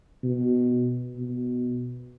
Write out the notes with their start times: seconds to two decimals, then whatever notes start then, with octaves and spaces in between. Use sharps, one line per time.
0.23 B2
1.17 B2